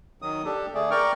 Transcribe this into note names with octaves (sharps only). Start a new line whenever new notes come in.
D#3 F#3 D#6
D4 G4 A4
D3 A3 G#4 D5
A#4 D5 G5 C#6 F6